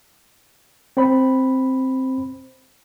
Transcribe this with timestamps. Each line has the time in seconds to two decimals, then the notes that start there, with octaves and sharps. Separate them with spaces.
0.97 C4 C5 B5